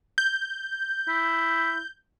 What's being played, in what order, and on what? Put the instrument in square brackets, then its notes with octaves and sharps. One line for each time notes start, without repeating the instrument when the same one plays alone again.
[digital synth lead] G6
[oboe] E4